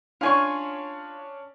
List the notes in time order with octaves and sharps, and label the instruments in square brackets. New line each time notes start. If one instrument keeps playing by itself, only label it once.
[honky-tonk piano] C#4 D4 C#5 [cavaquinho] F4 G#5 C#6